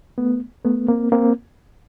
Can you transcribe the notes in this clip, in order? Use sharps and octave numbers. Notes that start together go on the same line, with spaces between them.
A3 B3
A3 B3
A#3 C4
A#3 C4